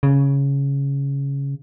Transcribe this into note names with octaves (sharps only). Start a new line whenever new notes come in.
C#3